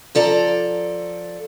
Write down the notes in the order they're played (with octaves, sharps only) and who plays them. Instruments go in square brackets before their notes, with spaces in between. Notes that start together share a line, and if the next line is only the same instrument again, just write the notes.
[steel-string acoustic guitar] F3 A4 D5 A#5